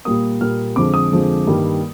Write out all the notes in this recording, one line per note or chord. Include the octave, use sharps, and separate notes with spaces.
A#2 G3 A#3 D#6
A#2 G3 A#3 F6
F2 D3 F3 G#3 D6
D#6
F2 D3 F3 G#3
G2 D#3 G3 A#3